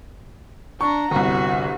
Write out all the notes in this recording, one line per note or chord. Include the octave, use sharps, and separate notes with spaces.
D4 A#5 C#6
G1 C2 F#4